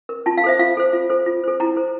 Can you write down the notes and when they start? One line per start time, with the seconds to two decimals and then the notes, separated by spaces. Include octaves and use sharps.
0.09 A#4
0.26 F4 A5
0.38 F5
0.44 A4 C5 E5
0.59 F4 F5
0.77 A4 C5
0.93 F4
1.10 A4 C5
1.26 F4
1.44 A4 C5
1.60 E4 A#5
1.76 A4 C5